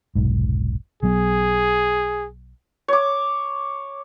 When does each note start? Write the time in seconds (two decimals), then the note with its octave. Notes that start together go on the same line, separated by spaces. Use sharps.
0.15 F1 B1 G#2
1.03 B1 F#3 B3 G#4
2.88 C#5 D6